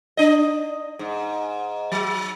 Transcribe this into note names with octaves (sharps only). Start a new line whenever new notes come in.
D4 D#5
G#2
F#3